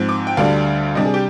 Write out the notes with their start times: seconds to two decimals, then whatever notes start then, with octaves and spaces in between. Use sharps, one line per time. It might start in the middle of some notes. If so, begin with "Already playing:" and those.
Already playing: G#2 F3 C4
0.09 D6
0.27 G5
0.37 D2 D3 G3 D4 F5
0.95 C3 G3 D4 D#5
1.05 G#4
1.14 G4